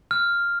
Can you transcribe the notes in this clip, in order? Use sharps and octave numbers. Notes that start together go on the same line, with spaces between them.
F6